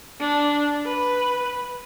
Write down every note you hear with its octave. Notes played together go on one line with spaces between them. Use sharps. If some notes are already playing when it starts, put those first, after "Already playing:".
D4
B4